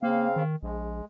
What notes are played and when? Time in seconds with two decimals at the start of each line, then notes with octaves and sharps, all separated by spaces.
0.03 C#3 A#3 C4 F5
0.36 D#3
0.63 A#1 G#3